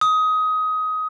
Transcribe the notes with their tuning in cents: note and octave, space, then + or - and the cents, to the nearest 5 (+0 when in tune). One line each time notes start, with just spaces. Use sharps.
D#6 +20